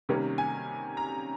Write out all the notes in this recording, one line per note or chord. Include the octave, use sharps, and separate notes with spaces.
C3 D#3 G3 A#3 C#4
G#5
A#5